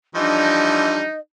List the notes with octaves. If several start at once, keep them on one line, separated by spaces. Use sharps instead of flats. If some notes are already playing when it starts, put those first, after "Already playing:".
E3 F3 G3 D4 D#4 D#5